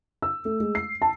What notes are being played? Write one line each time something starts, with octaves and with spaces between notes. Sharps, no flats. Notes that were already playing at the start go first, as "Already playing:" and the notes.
E6
A3
G#3
C7
A5